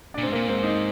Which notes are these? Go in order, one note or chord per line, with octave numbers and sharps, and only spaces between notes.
A#2 D4
G#2 C4
A#2 A#3
G#2 C4
D#4